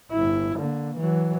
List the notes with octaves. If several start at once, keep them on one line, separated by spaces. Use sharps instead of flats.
G1 E4
D3 A#3
E3 F#3